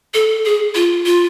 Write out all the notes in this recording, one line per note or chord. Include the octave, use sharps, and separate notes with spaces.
A4
G#4
F4
F4